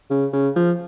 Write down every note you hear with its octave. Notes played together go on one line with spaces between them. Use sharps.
C#3
C#3
F3